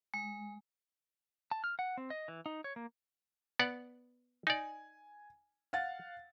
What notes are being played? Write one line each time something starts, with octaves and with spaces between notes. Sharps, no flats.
G#3
A5
F6
F#5
C4
D#5
E3
D#4
C#5
A#3
B3 D5 F#5
D#4 D5 G#5
F5 F#5 A6